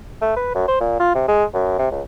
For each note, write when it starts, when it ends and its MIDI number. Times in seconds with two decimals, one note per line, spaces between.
0.22 0.35 57
0.37 0.52 71
0.55 0.64 42
0.68 0.80 72
0.81 0.96 46
1.00 1.14 65
1.15 1.23 48
1.28 1.44 56
1.54 1.78 42
1.79 1.89 48
1.91 2.02 37